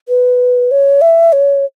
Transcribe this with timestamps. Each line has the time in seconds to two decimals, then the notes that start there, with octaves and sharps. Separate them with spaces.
0.09 B4
0.71 C#5
1.01 E5
1.33 C#5